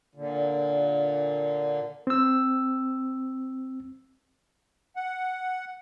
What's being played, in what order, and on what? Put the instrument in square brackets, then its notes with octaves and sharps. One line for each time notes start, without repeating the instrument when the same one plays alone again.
[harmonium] A#2 D3
[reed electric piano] C4 E6
[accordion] F#5